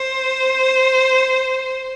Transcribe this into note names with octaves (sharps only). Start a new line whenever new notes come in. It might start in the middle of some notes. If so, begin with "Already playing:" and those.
Already playing: C5